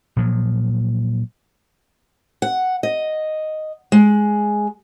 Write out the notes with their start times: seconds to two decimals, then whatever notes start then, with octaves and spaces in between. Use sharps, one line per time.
0.17 A#2 F3 F#3
2.42 F#5
2.83 D#5
3.92 G#3